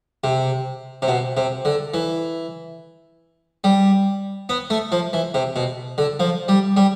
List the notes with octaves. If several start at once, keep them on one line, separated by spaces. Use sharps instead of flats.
C3
C3
B2
C3
D3
E3
G3
B3
A3
F3
E3
C3
B2
D3
F3
G3
G3